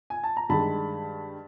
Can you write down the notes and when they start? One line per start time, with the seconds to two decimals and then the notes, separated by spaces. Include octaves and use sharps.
0.10 G#5
0.23 A5
0.37 A#5
0.49 G2 D#3 G#3 A5 B5